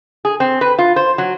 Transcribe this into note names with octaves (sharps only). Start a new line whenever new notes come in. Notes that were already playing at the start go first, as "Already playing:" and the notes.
G#4
C4
B4
F4
C5
F#3